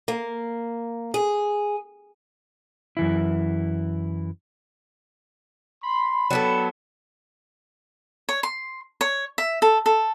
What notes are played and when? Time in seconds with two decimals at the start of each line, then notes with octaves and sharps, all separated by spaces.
0.08 A#3
1.14 G#4
2.97 F#2 E3 E4
5.83 B5 C6
6.30 F#3 B3 D4 A4 G5 A5
8.29 C#5
8.43 C6
9.01 C#5
9.38 E5
9.62 A4
9.86 A4